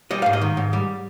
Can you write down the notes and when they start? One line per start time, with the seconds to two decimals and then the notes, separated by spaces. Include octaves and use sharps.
0.11 G3 D#5
0.22 G#2 F5
0.33 D#5
0.42 D#3
0.57 G#2
0.73 G3